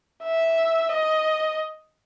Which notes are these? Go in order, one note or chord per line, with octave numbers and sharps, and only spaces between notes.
E5
D#5